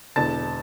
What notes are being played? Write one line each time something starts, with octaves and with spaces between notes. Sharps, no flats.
E1 E2 D3 A5 A6